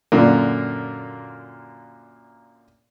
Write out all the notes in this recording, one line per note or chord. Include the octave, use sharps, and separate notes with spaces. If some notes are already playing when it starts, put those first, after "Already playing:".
F#2 A#2 D3 A#3